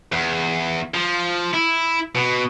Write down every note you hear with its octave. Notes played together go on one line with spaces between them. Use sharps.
E2
F3
E4
B2